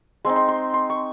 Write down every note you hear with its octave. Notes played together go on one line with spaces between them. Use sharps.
G#3 C4 D#4 C6
C6
C6
C6
C#6